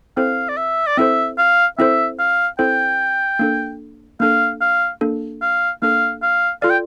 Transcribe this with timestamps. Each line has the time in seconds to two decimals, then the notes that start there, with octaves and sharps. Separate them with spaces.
0.17 C4 E4 A4 C5 F5
0.49 D5
0.57 E5
0.87 D5
0.97 C4 E4 A4 C5 E5
1.38 F5
1.78 C4 E4 A4 C5 E5
2.19 F5
2.59 C4 E4 A4 C5 G5
3.39 A#3 D4 A4
4.20 A#3 D4 A4 F5
4.61 F5
5.01 A#3 D4 A4
5.42 F5
5.82 A#3 D4 A4 F5
6.22 F5
6.62 F4 A4 D5 F5
6.70 G5